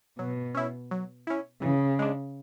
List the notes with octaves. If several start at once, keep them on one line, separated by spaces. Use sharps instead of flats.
B2 F#3
C#4 E4
F#3
C#4 E4
C#3 E3
G#3 D4